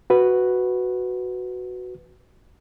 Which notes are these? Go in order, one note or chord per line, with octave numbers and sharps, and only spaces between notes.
F#4 B4